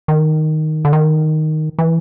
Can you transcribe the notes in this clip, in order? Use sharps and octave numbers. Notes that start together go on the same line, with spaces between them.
D#3
D3
D#3
E3